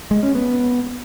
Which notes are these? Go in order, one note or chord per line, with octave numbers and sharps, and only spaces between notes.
G#3
C#4
B3